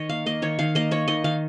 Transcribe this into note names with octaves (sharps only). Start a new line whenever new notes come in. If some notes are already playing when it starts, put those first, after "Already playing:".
Already playing: D#3 C#5 D#5
A#3 F5
A#3 D#5
D#3 C#5
D#3 F5
A#3 D#5
A#3 C#5
D#3 D#5
D#3 F5